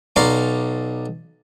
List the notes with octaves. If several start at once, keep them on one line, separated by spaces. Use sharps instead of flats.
B1 D5 F5 A#5 C6 C#6